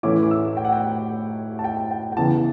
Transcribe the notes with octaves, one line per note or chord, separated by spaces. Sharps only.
A2 E3 A3 C#4 E4 D6
D6
E6
G5
F#5
G5
A5
G5
G5
G5
C#3 E3 B3 E4 A5